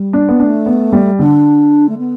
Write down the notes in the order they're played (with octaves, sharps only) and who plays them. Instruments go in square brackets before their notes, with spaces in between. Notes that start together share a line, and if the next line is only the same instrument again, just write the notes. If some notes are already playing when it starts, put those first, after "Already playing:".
Already playing: [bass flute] G3
[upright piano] D4
B3
[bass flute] A3 [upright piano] D4
[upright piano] B3
G3
[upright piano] D3 [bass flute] D4
[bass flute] A3
B3